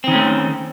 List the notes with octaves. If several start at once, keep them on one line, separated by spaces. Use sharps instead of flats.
D#3 A3 C4 C#4